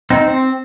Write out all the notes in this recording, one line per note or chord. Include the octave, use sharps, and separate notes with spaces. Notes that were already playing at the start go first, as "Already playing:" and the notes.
C4 D#4
C4